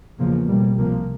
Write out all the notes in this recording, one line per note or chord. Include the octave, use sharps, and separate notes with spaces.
E2 C#3 F3 A#3
B2 G3 A#3
C2 C3 F3 A#3